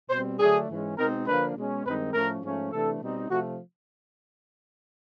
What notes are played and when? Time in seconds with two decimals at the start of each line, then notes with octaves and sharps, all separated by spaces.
0.10 B2 G3 C4 C5
0.40 D3 F#3 A3 D4 G#4
0.69 G#2 E3 G#3 C#4
0.97 B2 G#3 C4 D#4 A#4
1.27 D3 F3 A#3 D4 B4
1.55 B2 G#3 C#4
1.84 G2 D#3 G#3 C4 D#4 B4
2.13 A2 F3 A3 C#4 A#4
2.43 G#2 F3 A3 C#4
2.72 C3 E3 A3 D4 A4
3.01 B2 G3 C4 D#4
3.30 C3 F3 A3 F#4